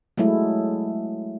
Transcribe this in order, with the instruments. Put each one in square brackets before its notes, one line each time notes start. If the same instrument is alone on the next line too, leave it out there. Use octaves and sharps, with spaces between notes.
[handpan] F#3 G#3 A3 E4